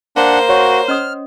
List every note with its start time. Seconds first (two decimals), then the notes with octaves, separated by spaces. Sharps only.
0.16 A#3 D4 C5 F#5
0.49 F#4 C#5 C6
0.88 C#4 D#5 D#6 F6